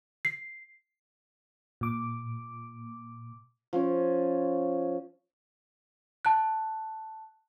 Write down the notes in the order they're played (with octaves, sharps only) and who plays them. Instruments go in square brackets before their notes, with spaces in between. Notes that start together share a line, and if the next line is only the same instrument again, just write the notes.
[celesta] C7
[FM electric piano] A#2 D6
[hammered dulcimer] F3 C#4
[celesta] A5 F#6